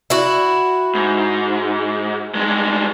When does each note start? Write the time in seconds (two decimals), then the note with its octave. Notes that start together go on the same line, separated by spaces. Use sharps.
0.10 E4 F#4
0.95 G#2
2.35 G2 G#3